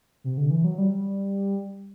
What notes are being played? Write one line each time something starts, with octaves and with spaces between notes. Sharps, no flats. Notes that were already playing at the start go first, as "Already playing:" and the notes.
C3
D3
E3
F#3
G3